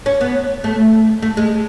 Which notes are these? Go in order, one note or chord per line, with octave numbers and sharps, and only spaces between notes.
C#4
B3
A3
A3
G#3